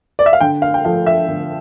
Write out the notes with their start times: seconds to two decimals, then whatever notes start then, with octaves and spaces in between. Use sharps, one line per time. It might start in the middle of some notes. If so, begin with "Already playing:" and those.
0.19 D5
0.26 E5
0.33 F5
0.41 D3 G5
0.62 F5
0.74 G5
0.85 F3 A3 F5
1.06 E5
1.28 D3